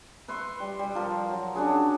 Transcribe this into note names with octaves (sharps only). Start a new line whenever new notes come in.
B4 E5 C6 C#6
G3
G3
F3 A#4
F#3
C#4 D4 F#4 G#4